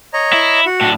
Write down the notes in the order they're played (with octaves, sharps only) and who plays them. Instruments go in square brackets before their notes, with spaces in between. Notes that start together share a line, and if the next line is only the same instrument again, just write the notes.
[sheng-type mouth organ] C#5 D#5 A#5
[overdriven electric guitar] E4
[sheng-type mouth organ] F#4 F#5
[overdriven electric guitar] A2 D4